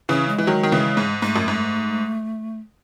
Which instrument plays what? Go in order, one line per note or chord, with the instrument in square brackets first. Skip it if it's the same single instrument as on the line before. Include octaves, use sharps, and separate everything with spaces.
[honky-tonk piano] C#3 E3 [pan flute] C#4
[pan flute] G#3
[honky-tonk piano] E3
D#3 F#3
D#3
C#3 E3
G#2
[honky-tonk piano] G#2 [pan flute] A3
[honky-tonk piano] F#2
G#2